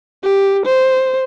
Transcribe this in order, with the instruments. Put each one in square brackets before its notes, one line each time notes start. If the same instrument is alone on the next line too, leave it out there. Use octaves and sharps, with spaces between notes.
[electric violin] G4
C5